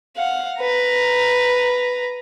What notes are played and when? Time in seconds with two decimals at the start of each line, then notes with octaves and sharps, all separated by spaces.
0.17 F5 F#5
0.60 B4 A#5